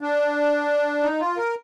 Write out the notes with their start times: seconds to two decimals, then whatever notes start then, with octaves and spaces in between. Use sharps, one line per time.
0.01 D4
1.03 D#4
1.20 F4
1.37 A#4